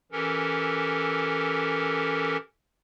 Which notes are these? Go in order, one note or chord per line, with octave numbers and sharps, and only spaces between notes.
E3 C#4 G4 A4 A#4